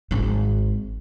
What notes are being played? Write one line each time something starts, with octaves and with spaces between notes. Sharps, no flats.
G#1 G#2